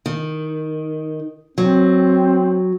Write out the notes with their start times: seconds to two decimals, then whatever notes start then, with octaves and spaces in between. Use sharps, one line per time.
0.06 D#3
1.58 F#3 C4